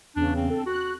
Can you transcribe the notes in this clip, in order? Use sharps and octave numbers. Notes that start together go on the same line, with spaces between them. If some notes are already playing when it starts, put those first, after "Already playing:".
E2 C#3 D4
C4
A4
F#4 F#6